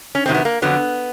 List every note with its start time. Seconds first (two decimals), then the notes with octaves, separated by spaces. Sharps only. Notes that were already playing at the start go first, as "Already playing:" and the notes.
0.15 C#4
0.26 E2 C3 D#3 F#3 C4
0.35 B3
0.45 A#3
0.62 F2 D3 F#3 B3